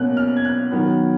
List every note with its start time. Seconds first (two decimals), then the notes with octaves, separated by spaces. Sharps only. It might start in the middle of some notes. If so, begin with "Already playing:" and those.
Already playing: B2 A#3 C#4 F#6
0.17 F6
0.37 G#6
0.45 F#6
0.71 D#3 F#3 B3